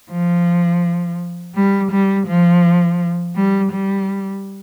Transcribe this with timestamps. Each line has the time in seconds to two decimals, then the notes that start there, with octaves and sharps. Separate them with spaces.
0.10 F3
1.55 G3
1.91 G3
2.27 F3
3.35 G3
3.71 G3